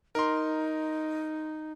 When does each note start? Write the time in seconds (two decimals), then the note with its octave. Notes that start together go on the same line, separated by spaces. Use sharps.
0.15 D#4 A#4 C6